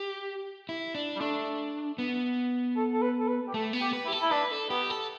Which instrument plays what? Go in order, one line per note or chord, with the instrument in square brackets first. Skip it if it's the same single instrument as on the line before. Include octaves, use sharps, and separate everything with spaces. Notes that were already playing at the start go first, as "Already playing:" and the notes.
Already playing: [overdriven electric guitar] G4
E4
D4
[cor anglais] G3
[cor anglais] A3 [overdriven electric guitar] D4
[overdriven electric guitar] B3
[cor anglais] A4
A4
B4
A4
B4
G4
[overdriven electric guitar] A3 [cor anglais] A4
[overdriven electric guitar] B3
[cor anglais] G4
[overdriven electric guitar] B4
[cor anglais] E4 [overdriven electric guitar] G4
[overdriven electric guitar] A4
[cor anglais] E4
[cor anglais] D4 [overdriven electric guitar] B4
[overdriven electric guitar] A4
[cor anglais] B3 [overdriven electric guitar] G4
[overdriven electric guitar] A4